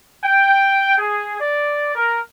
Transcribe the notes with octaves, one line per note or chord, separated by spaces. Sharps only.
G5
G#4
D5
A#4